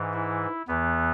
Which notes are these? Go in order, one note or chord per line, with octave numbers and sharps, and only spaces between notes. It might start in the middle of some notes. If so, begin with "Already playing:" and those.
Already playing: G#2 E3
E4
E2 E3 B3